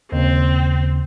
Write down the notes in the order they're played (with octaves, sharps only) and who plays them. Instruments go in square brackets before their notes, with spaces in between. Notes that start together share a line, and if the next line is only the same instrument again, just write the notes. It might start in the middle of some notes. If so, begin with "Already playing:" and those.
[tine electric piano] D#2 C#3 [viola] C4